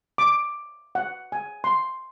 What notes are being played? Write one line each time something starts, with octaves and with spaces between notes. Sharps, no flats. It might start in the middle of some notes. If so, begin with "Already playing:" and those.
D6
F#5
G#5
C6